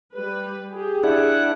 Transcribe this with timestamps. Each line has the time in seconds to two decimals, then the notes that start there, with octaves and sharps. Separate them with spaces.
0.14 G3 B4
0.71 G4 G#4
1.03 D4 E4 F#5